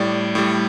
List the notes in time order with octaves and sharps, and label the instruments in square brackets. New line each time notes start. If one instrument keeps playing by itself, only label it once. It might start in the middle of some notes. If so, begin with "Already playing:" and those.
Already playing: [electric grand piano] A2 G3 D5
A2 G3